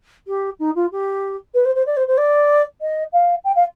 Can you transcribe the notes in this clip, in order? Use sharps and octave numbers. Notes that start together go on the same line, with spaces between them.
G4
D#4
F4
G4
B4
C5
C5
D5
C5
C5
D5
D#5
F5
G5
F5